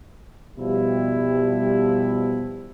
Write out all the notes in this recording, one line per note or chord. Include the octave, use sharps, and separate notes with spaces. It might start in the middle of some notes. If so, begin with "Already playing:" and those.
B2 F3 G3 E4